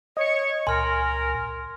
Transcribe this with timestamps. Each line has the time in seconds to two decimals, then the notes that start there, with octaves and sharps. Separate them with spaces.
0.17 C#5 D#5 C#7
0.67 C#2 A#2 A#4 G#5 C6 F6